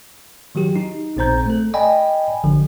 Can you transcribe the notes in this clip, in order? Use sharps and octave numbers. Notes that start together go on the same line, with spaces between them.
D#3 F#3 F#4 G4
D#4
A#1 A#2 C4 C5 A#5 G6
A3 A4
D5 D#5 G5 G#5 B5
G#1 D3 F3